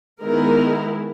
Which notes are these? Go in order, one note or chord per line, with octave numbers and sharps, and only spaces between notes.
D#3 G#3 B3 E4 A#4